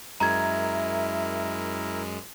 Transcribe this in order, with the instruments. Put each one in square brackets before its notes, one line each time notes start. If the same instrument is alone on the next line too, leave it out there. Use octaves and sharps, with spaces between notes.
[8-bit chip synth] F#2 G#3 [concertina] E4 A#4 [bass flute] E5 [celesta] A#5 G#6